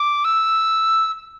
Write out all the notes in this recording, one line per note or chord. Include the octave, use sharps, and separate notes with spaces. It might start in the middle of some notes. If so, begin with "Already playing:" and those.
Already playing: D6
E6